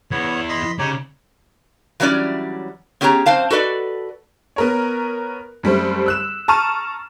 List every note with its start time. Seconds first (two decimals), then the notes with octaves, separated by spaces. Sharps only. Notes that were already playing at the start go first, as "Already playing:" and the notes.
0.11 E2 B3 E4 C#5
0.49 D#5 B5 C6
0.79 C#3 D#4 G4 C#5
2.00 E3 F#3 G3 C#4 D5
3.01 B3 C#4 G4 G#4 C#5 A#5
3.26 F#2 C4 C5 F5 A5
3.50 F#4 A4 B4 D5 D#5
4.56 B3 A#4 C#5
5.63 F#2 G3 A3 C4
6.06 E6 F#6 E7
6.48 A5 A#5 C#6 F6 D#7 E7